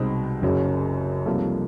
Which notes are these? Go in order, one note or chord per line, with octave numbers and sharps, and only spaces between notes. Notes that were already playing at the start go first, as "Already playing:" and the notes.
Already playing: C2 B2 G#3 C4 D#4
F#1 F#2 C#3 F#3
C2 C3 F3 A#3 D#4 A4